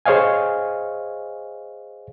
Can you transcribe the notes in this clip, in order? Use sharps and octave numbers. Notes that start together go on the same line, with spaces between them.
G#4 C5 C#5 D#5 F5 G#5